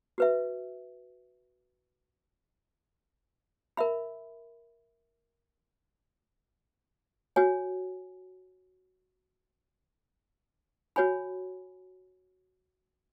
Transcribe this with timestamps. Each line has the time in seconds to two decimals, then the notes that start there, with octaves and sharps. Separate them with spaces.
0.18 F#4 B4 E5
3.77 A#4 E5 B5
7.36 F#4 C#5 G#5
10.96 F#4 C#5 G#5 B5